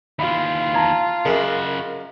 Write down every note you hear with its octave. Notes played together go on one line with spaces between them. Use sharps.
D#2 E3 F4 B5
A5 A#5 G#6
F#2 C#3 G#3 F#4 A#4